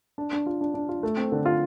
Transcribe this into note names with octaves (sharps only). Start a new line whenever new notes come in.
D4
D4
F4
D4
D4
F4
A3
C4
D3
F4